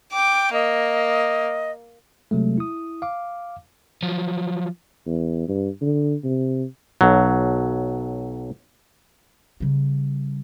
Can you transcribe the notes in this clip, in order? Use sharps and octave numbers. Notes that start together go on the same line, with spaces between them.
G5 D6
A#3 D#5
C3 F#3 G#3 A3
E4 D#6
F5 D6
F3 F#3
E2
G2
D3
C3
B1 F#3
C#3 G3